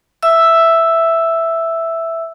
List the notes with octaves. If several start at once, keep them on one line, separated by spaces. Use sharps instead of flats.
E5 E6